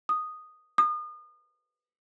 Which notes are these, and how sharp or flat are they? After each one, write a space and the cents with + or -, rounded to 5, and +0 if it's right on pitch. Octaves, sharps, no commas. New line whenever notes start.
D#6 -5
D#6 -35